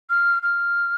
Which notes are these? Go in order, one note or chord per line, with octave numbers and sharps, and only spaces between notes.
F6
F6